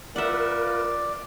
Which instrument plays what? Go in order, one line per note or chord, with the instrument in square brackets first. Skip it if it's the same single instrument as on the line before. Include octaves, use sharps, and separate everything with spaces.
[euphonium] F4 [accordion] A#4 B4 [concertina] D5 [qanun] E5 F#5